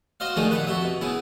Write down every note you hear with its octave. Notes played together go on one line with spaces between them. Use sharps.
F#4 C5 D#5 F5
D3 D#3 F3 G#3 A3 G#4
A#1 D#2 B4 F#5 B5
F2 F#4 G4 E5
B2
C#3 B3 E4 G#4